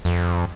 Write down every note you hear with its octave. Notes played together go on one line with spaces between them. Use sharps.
F2